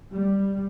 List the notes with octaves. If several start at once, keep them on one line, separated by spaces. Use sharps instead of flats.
G3